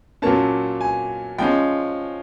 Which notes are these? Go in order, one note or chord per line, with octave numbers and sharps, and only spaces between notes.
A#2 F#3 A#3 C#4 A5
G#5
F3 G#3 C#4 G5